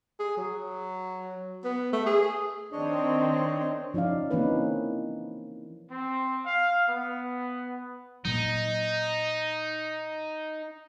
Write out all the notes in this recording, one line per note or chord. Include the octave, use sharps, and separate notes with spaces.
G#4
F#3
B3
A3
G#4
D#3 C4 D4 C#5 D#5
F3 C#4 D#4 D5 F5
E3 A#3 C4 C#4 D#4 B4
C4
F5
B3
A#2 F#3 D#4